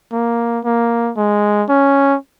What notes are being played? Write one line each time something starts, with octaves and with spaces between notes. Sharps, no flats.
A#3
A#3
G#3
C#4